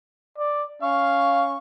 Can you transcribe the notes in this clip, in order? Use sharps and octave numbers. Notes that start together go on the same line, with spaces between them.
D5
C#4 F5 C#6